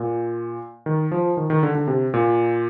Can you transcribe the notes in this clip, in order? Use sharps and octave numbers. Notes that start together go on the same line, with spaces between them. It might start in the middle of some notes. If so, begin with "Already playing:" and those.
Already playing: A#2
D#3
F3
D#3
D#3
D3
D3
C3
A#2